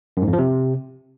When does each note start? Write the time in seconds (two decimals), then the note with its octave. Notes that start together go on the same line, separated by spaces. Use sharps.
0.17 F#2
0.22 G#2
0.28 F2
0.33 F3
0.38 C3